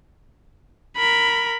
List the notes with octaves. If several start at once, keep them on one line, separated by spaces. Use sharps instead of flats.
A#4 B5